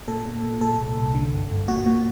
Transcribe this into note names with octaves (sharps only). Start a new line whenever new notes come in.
A#2 A4
A#2
A#2
A#2 A4
C2
C2
D3
G1
G1
A#2 F#4
A#2